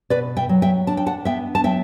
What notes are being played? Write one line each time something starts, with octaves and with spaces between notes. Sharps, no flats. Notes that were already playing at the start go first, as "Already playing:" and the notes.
B2 B4 D5
E5 G5
F#3
E5 G5
D4 A5
G5
F#5 A5
B3 E5 G5
A5
F#3 E5 G5